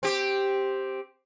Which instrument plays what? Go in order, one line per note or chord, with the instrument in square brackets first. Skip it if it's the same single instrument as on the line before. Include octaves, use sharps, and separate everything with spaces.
[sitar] C4 G4